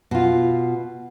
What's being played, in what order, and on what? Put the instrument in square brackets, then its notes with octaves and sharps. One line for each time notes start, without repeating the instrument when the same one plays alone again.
[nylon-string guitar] B2 F4